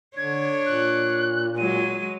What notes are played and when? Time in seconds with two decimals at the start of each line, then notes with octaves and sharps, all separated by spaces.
0.17 D3 D4 C#5 G#6
0.66 A#2 F#6
1.58 F#3 G#3 D#7